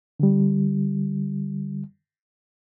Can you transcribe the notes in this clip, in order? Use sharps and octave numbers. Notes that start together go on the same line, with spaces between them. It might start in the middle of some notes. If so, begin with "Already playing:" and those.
D3 G3